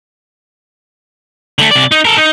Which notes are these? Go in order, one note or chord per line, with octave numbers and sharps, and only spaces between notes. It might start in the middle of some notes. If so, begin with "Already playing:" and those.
D3 A3
C3 D5
D#4
A4 A#4
D#4